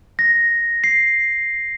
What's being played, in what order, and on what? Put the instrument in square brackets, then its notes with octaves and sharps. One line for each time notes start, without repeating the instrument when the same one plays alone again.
[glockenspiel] A#6
C7